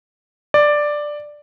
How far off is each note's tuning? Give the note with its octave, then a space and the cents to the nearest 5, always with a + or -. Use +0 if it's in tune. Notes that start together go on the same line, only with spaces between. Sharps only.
D5 +5